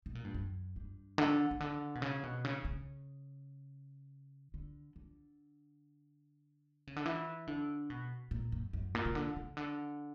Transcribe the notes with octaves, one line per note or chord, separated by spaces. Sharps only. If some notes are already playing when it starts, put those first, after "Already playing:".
B2
A#2
G2
F#2
G2
D3
C#3
D3
B2
C#3
B2
C#3
C#3
D3
D3
C#3
D3
E3
D3
B2
A#2
F#2
F#2
A#2
C#3
D3
C#3
D3